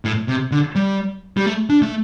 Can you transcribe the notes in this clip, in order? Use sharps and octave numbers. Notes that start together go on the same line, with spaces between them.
A2
C3
D3
G3
G3
A3
D4
A3